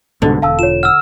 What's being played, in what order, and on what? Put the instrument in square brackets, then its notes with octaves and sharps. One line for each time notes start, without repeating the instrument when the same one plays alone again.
[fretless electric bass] C2 G#2 B2 [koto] D3
[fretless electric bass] E1 [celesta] F5 A5 E6
[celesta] F4 C#5 [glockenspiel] E7
[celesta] F#5 [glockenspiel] E6 F6